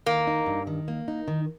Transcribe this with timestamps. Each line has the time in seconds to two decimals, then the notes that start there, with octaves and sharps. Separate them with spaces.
0.06 D#3 A#3
0.27 D#4
0.46 G2
0.67 D#3
0.88 A#3
1.08 D#4
1.28 D#3